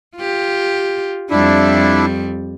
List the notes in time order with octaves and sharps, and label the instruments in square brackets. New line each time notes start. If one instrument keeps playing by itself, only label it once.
[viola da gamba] F4 G4
[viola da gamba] F2 G3 [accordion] D4 E4